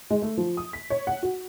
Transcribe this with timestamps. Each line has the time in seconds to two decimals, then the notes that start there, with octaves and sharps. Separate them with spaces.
0.10 G#3
0.22 A3
0.37 F3
0.57 D#6
0.73 B6
0.90 C#5
1.07 F#5
1.23 F#4